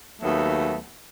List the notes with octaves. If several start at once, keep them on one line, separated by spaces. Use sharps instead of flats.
D#2 F#3 A3 B3